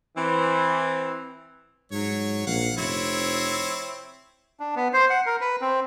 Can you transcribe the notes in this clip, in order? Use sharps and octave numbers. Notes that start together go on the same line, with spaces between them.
E3 C4
G#2 F#3 C#5
A#1 F5 F#5
F1 C4 E4 C#5
D4
B3
C5
F#5
A#4
B4
C4